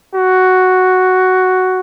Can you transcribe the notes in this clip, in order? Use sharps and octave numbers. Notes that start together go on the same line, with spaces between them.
F#4